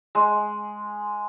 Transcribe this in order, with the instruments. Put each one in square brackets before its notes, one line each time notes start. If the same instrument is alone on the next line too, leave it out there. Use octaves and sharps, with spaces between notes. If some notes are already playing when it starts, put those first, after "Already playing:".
[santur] G#3